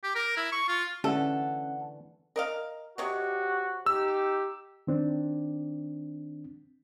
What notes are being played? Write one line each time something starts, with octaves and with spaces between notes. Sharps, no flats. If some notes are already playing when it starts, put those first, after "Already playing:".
G4
A#4
E4
C#6
F4
D3 E3 A3 C#4 A4 F#5
A#4 D#5 F5
C3 F#4 G4 C#5 D#5
D#4 G4 E6
D#3 C4 D4